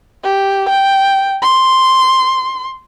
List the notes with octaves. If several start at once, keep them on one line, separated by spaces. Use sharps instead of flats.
G4
G5
C6